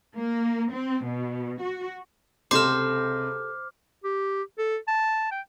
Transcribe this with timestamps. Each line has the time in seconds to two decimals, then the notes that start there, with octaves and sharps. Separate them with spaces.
0.16 A#3
0.71 C4
1.05 B2
1.61 F#4
2.51 C#2 C3 G4 A4 C5 D6 F6 E7
4.04 G4
4.58 A4
4.88 A5
5.31 G5